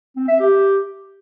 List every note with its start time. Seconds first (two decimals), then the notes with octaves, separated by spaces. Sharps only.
0.16 C4
0.28 E5
0.40 G4